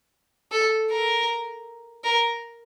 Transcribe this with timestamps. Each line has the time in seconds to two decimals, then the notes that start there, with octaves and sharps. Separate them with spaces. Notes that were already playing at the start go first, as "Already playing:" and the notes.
0.52 A4
0.90 A#4
2.04 A#4